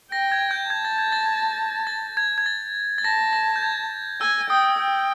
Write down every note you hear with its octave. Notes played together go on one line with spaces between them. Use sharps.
G5 A#6
G#6
G6
A5 G#6
A6
G#6
A6
G#6
A6
G#6
G#6
A6
A6
A5 A#6
A#6
G6
G#6
G#5 E6
G5 D#6
G5